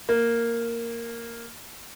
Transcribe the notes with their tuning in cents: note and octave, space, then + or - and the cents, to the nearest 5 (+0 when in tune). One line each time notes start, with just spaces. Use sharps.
A#3 -5